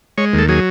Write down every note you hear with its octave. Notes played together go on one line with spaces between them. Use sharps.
G#3 C#5
D#2 A4
F#3 G#4